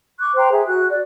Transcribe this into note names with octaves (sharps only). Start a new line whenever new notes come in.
C#6 D6 F#6
C5 G5 A#5 C6
G#4 E5
F#4 F#6
D5